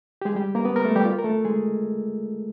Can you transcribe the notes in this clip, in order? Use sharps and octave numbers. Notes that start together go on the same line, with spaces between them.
G4
G#3 G#4
G3 G4
A#3 A#4
B3 B4
A#4
A3 A4
G3 G4
F4
A#4
A3 A4
G#3 G#4